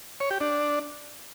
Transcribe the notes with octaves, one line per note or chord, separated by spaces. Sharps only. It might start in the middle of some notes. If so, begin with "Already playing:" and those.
C#5
G4
D4